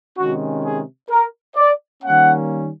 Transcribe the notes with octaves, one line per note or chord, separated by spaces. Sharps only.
C3 D#3 G#3 C#4 F#4
G#4
A#4
D5
D#3 G3 A#3 C#4 F#5